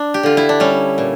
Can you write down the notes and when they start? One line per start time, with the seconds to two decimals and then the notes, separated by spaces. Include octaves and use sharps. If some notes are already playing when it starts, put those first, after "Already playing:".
Already playing: D4
0.14 G4
0.23 D3 F4
0.37 E4
0.49 D4
0.60 G3 C#4
0.98 A#2